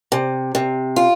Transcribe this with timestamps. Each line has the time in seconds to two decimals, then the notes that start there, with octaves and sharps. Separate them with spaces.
0.12 C3
0.55 C3
0.96 F4